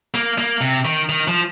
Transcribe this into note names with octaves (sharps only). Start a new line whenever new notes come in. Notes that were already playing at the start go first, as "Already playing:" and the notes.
A#3
A#3
C3
D#3
D#3
F3